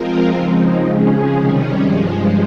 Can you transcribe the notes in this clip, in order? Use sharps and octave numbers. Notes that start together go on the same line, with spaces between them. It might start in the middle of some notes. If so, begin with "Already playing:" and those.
Already playing: F3 G#3 C4 F4 A#4
C#3 F3 G#3 C4 D#4
C#3 F3 G#3 C#4 G#4
C3 D#3 G3 C#4
G2 F3 G#3